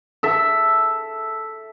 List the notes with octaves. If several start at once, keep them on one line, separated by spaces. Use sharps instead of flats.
A4 E5